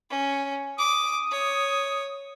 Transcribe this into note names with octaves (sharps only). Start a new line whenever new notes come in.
C#4
D6 D#6
C#5